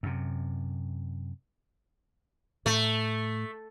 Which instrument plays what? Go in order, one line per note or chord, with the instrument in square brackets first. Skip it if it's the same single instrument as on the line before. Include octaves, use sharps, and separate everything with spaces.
[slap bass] F#2 C3
[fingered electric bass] A2 [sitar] A3